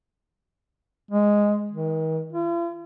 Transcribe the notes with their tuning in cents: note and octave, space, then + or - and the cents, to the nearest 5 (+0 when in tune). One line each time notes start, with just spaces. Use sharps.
G#3 -5
D#3 +40
F4 -45